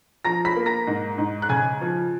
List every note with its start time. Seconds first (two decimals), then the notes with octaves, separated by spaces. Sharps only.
0.25 F3 A#5 A#6
0.45 B5 B6
0.56 A#3
0.66 A#5 A#6
0.87 G#2
1.18 G#2
1.42 F#6
1.49 C#3 G#5 G#6
1.81 F3